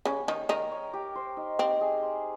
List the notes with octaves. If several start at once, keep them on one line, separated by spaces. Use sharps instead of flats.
C#3 C#4 G4
D#3 D#4 C#5
D#3 D#4 A#4
C#5
G4
C5
D#4
C4 G4
G#4
C5